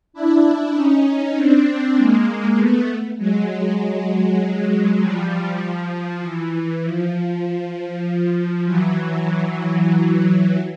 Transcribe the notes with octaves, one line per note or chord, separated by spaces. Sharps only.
D4 E4
C#4 D#4
C4 D4
G#3 A#3
A3 B3
F#3 G#3
F3 G3
F3
E3
F3
E3 F#3